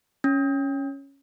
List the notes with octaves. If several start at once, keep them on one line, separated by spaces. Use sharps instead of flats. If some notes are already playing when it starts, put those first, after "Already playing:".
C#4